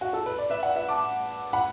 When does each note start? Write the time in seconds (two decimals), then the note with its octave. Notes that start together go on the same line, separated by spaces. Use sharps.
0.01 F#4
0.13 A4
0.26 B4
0.38 D5
0.50 B4 E5
0.63 D5 F#5
0.76 B4 E5
0.88 A5 D6
1.53 F#5 B5